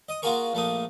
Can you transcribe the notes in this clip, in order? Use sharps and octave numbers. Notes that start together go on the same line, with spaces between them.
D#5 D#6
A#3 F4 F#4 G#4 A#4 C#6
A#1 A3 A#3 D#6